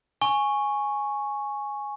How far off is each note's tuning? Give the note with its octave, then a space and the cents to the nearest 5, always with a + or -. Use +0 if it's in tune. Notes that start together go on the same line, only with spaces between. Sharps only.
G#5 +0 C#6 -5